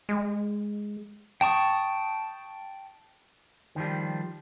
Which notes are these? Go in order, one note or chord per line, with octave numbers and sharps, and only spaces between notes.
G#3
G5 A5 C#6 D#6
D#3 F3 G3